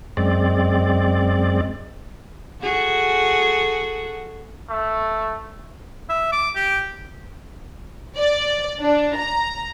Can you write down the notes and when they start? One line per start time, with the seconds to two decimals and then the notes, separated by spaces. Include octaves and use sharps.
0.17 F#2 G#3 C4 D5
2.61 F#4 G#4 A4
4.70 A3
6.09 E5
6.32 D6
6.55 G4
8.17 D5
8.80 D4
9.16 A#5